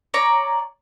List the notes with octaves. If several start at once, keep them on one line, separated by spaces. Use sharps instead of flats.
C#5 D5 A#5